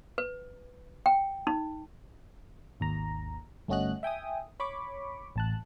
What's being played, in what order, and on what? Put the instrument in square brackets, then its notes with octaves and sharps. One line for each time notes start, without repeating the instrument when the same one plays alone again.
[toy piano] B4
G5
D#4
[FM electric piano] G#1 D#2 A#5
G1 A3 C#4 F#4 D#5 F#6
E5 G5 G#5 D#6
C#5 B5 C#6 D6
A1 A5 F#6